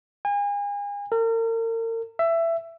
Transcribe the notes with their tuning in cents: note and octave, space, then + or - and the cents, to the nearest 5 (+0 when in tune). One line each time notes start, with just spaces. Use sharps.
G#5 -35
A#4 -40
E5 +15